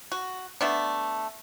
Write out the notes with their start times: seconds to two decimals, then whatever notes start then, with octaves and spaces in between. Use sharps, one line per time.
0.12 F#4
0.61 A3 B3 D4